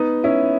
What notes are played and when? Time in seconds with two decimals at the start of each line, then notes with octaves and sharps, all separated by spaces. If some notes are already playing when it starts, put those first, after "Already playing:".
Already playing: B3 D#4
0.24 C#4 E4